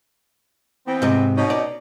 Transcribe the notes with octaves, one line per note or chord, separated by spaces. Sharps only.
E3 B3 C4
G#2 C3
B2 C#4 D#4
D5